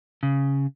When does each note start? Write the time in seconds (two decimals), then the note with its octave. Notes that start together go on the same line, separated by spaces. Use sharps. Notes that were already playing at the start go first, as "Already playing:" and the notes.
0.23 C#3